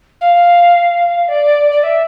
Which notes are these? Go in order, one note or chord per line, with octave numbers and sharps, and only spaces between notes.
F5
D5
D5
E5